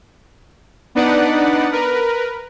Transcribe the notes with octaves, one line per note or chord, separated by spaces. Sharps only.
B3 D4 D#4 B4 D5 F#5
A#4 B4